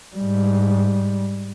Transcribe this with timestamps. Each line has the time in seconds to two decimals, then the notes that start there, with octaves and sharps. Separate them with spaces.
0.16 G#2 G3